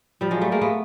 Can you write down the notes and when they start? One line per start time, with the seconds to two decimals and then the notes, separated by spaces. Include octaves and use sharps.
0.21 F3 G3
0.31 F#3 G#3
0.41 G3 A3
0.52 G#3 A#3
0.61 A3 B3